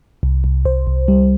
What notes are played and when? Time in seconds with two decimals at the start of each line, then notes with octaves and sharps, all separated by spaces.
0.23 C2
0.44 C2
0.65 C2 C5
0.87 C2
1.08 G3